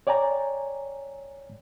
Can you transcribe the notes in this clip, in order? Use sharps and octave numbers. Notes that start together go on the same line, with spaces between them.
C#5 D5 G5 G#5 A#5